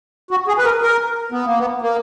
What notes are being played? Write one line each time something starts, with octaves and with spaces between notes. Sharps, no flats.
F#4
G#4
B4
A#4
A#4
B3
A#3
B3
A#3